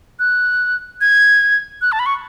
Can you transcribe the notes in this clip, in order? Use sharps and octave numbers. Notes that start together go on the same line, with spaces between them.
F#6
G#6
F#6
A5
B5
C#6